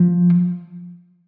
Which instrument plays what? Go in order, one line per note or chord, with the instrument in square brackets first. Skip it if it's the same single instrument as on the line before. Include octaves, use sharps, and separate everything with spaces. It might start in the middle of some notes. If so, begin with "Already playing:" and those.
Already playing: [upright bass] F3